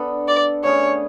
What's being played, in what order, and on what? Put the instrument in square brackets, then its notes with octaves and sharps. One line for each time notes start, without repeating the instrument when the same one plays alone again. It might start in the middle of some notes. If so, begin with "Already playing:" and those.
Already playing: [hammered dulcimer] B3 D4 A4
[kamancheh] D5
[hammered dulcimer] D3 A3 C#4 G#4 [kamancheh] C#5